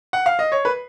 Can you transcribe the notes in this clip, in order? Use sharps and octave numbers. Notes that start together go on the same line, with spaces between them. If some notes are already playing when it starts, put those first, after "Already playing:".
F#5
F5
D#5
C#5
B4